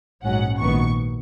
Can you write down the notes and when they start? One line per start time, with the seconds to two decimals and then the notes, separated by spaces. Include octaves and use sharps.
0.23 A#1 G#2 F#3 C#4 F#5
0.59 A#1 G#2 D#3 F#3 B3 C#6